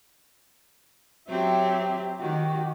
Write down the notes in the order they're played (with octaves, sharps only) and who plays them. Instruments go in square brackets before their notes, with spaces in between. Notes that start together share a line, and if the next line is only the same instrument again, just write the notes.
[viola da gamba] F#3 C4 [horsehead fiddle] G4 E5
[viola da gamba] D#3 [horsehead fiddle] F#4 G4